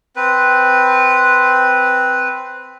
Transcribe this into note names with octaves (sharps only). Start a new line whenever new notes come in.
C4 B4